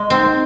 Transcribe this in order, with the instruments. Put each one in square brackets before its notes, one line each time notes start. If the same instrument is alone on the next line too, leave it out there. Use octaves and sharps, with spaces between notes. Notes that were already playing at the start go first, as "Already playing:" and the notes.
Already playing: [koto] G#3
[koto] C4 [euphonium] D#4